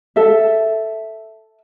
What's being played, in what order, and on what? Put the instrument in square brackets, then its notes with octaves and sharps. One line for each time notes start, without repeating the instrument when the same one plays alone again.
[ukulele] A4 E5